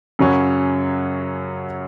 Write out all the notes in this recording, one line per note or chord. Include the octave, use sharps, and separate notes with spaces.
F#2 C#3 F#3 C#4